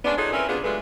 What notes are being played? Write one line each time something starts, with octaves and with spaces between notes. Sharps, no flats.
G#3 B3 C#4 D4
D#4 F4 F#4 G#4 A4 C#5
C4 C#4 E4 A#4 B4
C3 B3 D4 F4 G#4
F#3 G#3 A3 D4 F4 B4